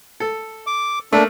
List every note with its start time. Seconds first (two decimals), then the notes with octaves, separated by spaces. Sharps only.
0.20 A4
0.67 D6
1.13 A3 A#3 D4